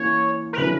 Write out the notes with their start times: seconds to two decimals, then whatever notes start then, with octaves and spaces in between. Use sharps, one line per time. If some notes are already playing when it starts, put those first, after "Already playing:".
Already playing: E3 A#3 C#4 E4 C#5
0.53 A#4
0.58 D3 F#3 C#4 E4 B4